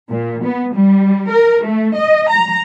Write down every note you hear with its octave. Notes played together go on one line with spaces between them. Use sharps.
A#2
B3
G3
A#4
A3
D#5
A#5